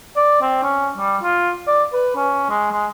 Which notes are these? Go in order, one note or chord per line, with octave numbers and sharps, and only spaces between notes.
D5
C4
C#4
G3
F4
D5
B4
C#4
G#3
G#3